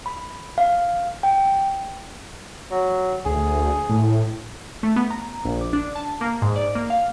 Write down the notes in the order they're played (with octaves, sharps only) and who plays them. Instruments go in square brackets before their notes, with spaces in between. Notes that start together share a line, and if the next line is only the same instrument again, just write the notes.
[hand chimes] B5
F5
G5
[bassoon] F#3
[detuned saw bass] D2 [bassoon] G#4
[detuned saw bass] A2
[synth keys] A3
B3
A#5
A#1
D6
D4
A5
A#3
G#2
D5
A#3
F5